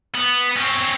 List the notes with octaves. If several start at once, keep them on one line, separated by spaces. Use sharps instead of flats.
B3
C4 C#4